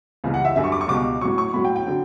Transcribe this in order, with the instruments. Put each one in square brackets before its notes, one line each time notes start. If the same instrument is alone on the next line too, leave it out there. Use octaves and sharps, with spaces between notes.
[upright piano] C#2 C#3 E3 G3
F#5
E5
F#2 D3 G3 E5
C#6
D6
C#6
C#2 B2 G3 D6
A2 F#3 C#6
C#6
A2 F#3 B5
G5
G5
D3 F#3